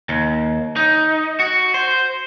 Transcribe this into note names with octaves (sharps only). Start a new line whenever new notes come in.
D#2
D#4
F#4
C5